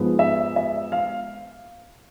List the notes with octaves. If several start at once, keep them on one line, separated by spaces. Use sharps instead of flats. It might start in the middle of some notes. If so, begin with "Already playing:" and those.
Already playing: G#2 F3 G#3 B3
E5
E5
F5